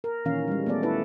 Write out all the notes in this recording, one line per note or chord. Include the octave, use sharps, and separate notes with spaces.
A#4
A#2 D#3 E3 C#4 F5
G3 G#3
A3 B3 A4 D5
D4 E4 A4 B4